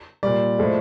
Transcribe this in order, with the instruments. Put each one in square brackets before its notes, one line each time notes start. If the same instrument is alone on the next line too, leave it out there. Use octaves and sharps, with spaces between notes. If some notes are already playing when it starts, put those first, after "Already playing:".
[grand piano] A#2 G3 D5
A2 F3 G#3